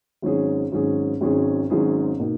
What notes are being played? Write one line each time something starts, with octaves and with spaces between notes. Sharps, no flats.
G#1 G#2 F#3 C#4 G#4
G#1 G#2 F#3 C#4 G#4
G#1 G#2 F#3 C#4 G#4
G#1 G#2 F#3 C#4 G#4
B2 A#3 D#4